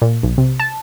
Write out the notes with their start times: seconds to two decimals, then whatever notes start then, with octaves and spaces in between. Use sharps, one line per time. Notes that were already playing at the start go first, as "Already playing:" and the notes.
0.02 A#2
0.23 B1
0.38 C3
0.59 A5